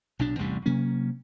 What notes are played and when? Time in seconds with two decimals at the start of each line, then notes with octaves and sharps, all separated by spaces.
0.19 B1 B2 D4
0.39 A1 E2 C3 G3
0.66 C3 F#3 A#3 C#4